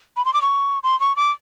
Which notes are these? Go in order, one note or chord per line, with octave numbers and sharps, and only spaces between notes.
B5
C6
D6
C#6
C6
C#6
D6